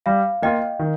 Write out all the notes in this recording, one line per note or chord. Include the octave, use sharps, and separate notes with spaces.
G3 F5
A#3 F4 D#5 G5
D#3